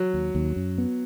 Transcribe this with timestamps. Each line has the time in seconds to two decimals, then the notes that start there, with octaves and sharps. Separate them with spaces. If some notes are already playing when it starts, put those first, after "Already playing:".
Already playing: F#3
0.13 D#2
0.35 D#2
0.56 F#2
0.78 B3